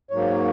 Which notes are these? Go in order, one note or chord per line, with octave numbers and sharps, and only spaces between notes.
G#2 F#3 A#3 C#5